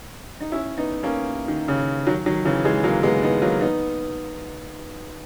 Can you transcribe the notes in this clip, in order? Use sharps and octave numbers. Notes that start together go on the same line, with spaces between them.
D#4
C#4 E4
B3 D#4
A#3 C#4
D#3
C#3
D#3 F#3
D#3 F#3
C#3 E3
E3 G#3
F#3 A#3
G#3 B3
B3 D#4
F#3 A#3
B3 D#4